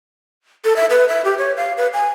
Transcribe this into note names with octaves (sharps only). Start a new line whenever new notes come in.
A4
E5
B4
E5
G4
C#5
F5
B4
G#5